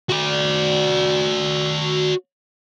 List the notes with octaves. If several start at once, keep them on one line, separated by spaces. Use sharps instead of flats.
F#4 D5